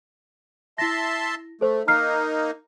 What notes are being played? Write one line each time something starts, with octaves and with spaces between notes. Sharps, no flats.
E4 E5 A5 C6 A#6
A3 A4 C5
A#3 D#4 A#5 F6 C7